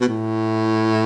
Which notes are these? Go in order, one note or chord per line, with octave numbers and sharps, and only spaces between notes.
B2
A2